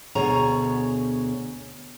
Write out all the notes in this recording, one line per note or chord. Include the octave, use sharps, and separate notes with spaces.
D2 B2 G#4 C#5 A#5